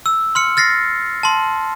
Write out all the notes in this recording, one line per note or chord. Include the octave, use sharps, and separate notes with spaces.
E6
C6 F6 C#7
F6 A6 A#6 C7
A5 C6